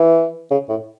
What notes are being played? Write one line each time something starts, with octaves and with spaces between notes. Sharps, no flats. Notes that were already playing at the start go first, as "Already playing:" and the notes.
Already playing: E3
C#3
A2